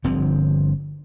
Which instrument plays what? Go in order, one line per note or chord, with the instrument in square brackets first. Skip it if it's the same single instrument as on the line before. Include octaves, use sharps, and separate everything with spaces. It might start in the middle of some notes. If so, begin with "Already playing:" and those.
[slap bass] G1 D3 F3 C4